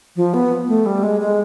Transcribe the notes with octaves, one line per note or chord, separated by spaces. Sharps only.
F3
B3
A3
G3
G#3
G#3